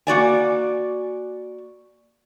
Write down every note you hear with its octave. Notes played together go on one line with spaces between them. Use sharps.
A#3 F#4 D5 G#5